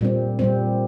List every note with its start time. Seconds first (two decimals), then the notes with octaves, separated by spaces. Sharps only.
0.01 A#2 G3 C4
0.39 A#2 G3 C4